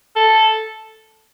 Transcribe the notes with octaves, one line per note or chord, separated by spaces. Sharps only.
A4